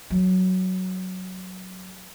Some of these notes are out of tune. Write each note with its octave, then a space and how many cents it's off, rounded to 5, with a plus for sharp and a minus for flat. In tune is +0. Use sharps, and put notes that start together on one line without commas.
F#3 +5